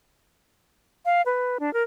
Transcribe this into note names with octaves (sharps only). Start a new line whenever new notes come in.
F5
B4
D4
A#4